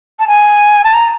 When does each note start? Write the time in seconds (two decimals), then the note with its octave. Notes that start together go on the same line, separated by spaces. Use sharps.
0.19 A5
0.28 G#5
0.84 A5
0.94 A#5